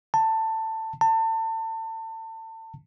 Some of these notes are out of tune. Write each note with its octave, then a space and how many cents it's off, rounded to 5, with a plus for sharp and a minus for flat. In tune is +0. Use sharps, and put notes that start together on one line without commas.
A5 +15
A5 +30